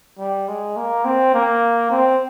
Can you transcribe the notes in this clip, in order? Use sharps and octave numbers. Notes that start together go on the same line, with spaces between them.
G3
G#3
A#3
C4
A#3
C4